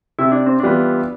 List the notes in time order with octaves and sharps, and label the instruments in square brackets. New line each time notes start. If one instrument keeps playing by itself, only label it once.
[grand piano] C3 [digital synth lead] E4
[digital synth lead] D4
C4
[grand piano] E3 G3 B3 F4 [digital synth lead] D4